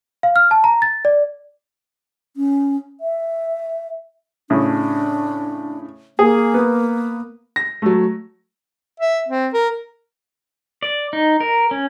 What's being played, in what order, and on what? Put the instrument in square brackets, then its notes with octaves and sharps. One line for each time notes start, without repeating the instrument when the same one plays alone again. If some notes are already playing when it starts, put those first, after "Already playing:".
[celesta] F5
F6
A5
A#5
A6
D5
[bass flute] C#4
E5
[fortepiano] A2 C#3 [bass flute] D4
[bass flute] A#3 [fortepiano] G#4
[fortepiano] B3
[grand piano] A#6
F#3 A3
[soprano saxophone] E5
C4
A#4
[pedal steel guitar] D5
D#4
A#4
C#4